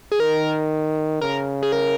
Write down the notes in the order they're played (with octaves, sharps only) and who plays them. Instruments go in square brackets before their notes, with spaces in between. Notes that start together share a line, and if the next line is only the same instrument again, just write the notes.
[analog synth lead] G#4
[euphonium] D#3 [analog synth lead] A#4
[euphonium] C#3 [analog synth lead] A#4
[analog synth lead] G#4
A#4